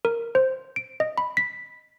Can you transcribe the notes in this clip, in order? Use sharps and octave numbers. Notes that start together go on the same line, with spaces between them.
A#4
C5
D7
D#5
B5
B6